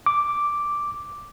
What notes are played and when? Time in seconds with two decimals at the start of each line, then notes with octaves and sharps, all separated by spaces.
0.06 D6